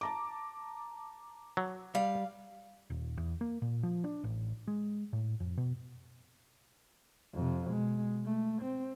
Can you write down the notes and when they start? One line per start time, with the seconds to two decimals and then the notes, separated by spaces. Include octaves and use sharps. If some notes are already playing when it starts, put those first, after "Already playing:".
0.01 A5 A#5 D6
1.57 F#3
1.95 G3 F5
2.90 D#1
3.17 E2
3.41 A#3
3.62 A#2
3.83 F3
4.04 D4
4.24 A1
4.68 G#3
5.13 A2
5.40 F2
5.57 B2
7.34 F2 C3
7.66 B2 G#3
8.25 A3
8.62 C4